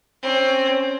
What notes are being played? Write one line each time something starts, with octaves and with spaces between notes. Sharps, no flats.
C4 C#4